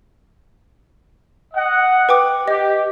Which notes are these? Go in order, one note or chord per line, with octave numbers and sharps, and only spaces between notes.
D#5 F#5
B4 G5 D6
G4 D#5